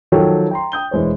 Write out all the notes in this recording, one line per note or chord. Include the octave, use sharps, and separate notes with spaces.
D#3 F3 F#3 A4 C#5 G5
G5 A#5 C6
G5 D#6 G6 G7
E1 E3 G#3 C5 C#5